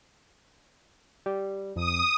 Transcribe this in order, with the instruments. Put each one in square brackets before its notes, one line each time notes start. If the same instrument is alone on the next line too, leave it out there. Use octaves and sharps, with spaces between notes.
[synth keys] G3
[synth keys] F2 [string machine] D#6